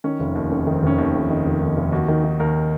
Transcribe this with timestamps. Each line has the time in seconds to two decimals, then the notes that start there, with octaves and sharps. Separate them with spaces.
0.04 D#3 C#4
0.20 F1
0.35 D#2
0.51 F1 C#4
0.67 D#3
0.74 C4
0.83 F1 C#4
0.98 D#2
1.14 F1
1.30 D#3
1.46 F1
1.61 D#2
1.77 F1
1.92 D#2 F#4
2.08 D#3
2.24 D#3
2.40 D#2 A#4